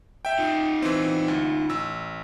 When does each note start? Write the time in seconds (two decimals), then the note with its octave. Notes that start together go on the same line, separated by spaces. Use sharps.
0.25 E5 G5
0.39 D#4 F4
0.82 E3 C4
1.28 D2
1.69 A1 E6